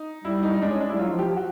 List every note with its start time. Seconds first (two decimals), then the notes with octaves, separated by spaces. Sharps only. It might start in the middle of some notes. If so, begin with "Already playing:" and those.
Already playing: D#4
0.24 G3 E4
0.43 D#4
0.54 D#4
0.62 G#3 D4
0.71 C#4
0.80 D4
0.89 G3 E4
0.99 F#3 F4
1.12 F3
1.19 G4
1.24 F3
1.37 F#4